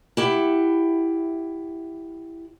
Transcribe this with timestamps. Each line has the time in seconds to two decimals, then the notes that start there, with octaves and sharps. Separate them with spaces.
0.17 E4 G4 F#5